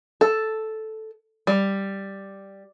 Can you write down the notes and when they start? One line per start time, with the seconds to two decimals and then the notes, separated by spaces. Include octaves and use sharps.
0.21 A4
1.47 G3